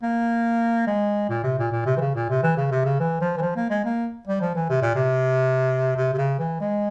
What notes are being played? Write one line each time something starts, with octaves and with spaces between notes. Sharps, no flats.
A#3
G#3
A#2
C3
A#2
A#2
C3
E3
C#3
A#2
C3
E3
C#3
C3
C#3
E3
F3
E3
F3
A#3
G#3
A#3
G3
F3
E3
C3
A#2
C3
C3
C3
C#3
E3
G#3